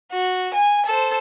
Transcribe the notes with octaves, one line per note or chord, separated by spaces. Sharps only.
F#4
G#5
A4 C5